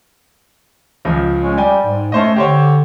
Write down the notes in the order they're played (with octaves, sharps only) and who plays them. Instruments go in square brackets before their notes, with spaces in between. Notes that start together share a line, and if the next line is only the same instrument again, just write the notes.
[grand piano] C#2 F3
[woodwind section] G#3 C#4
[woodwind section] G3 [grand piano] D5 G5 G#5
[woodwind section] G#2
[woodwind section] A3 [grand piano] C#4 C5 D#5
[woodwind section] D3 [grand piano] G4 C5 C#5